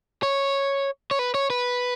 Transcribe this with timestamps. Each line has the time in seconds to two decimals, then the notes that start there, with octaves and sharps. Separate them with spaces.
0.23 C#5
1.11 C#5
1.19 B4
1.34 C#5
1.50 B4